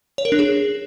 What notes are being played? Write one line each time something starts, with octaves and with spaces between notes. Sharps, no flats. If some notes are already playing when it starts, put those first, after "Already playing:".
C#5
A#4
D4
G#4